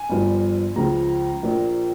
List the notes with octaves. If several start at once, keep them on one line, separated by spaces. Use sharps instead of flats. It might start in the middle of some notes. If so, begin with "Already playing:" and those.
Already playing: G#5
G1 G2 F3
C#2 C#3 F3 A#5
A#1 A#2 F3